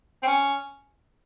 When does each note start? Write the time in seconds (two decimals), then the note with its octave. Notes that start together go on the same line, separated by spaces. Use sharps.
0.23 C4
0.27 C#4